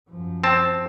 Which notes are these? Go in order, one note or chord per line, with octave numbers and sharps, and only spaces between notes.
F#2 F3
C4 A5